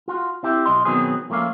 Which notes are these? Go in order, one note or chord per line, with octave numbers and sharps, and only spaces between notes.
F4 F#4
C4 E4 G4
B1 D#5 C6
B2 D#3 F#3 B3 C4 G#4
F3 A3 A#3 C#4 F5